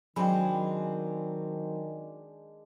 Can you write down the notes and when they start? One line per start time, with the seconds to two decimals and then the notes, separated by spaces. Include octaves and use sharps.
0.16 D#3 F#3 G#3 C4 D4 G5 G#5 B5